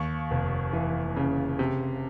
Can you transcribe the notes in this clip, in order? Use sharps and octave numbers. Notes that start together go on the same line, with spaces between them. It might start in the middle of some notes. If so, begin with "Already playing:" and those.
Already playing: D#2 C#6
F1
E3
C#3
C3